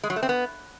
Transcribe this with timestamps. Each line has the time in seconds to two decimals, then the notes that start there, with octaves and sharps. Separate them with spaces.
0.03 G#3
0.10 F#3
0.16 A3
0.23 C4
0.29 B3